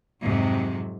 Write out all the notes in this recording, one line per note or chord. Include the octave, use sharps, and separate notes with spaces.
F2 G#2 C3 F#3